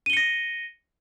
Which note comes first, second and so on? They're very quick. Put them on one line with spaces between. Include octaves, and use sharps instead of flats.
D#7 G7 C#7 A#6